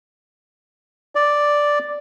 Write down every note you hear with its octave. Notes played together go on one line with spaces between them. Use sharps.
D5